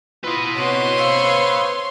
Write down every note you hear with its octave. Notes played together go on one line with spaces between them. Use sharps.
E4 F4 B4 D#5
B3 C4 F#4 C#5 C6
C5 F5 C#6 E6